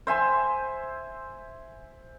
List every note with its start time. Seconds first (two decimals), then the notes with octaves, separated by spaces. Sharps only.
0.07 C5 E5 G#5 C6